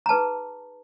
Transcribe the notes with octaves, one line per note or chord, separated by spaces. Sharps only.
A#5
D#4 G#4 B4 A5